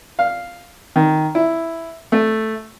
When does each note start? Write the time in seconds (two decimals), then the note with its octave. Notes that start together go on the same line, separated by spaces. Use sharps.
0.19 F5
0.96 D#3
1.35 E4
2.12 A3